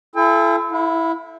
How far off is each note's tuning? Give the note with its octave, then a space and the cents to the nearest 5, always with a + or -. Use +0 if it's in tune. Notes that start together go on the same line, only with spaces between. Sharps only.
E4 +40 A4 -20 G5 +40
E4 +0 F5 +40